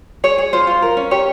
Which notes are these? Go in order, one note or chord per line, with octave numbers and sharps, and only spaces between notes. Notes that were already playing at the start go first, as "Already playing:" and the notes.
G#4 C#5
G#4
F4 C5
F4
A#4
C#4
G4 C#5